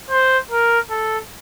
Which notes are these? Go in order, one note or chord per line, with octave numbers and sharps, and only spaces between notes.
C5
A#4
A4